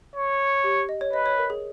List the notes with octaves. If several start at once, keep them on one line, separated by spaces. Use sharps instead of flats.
C#5
G4
D#5
C#5
B4 D#5
C#5
A#4
G#4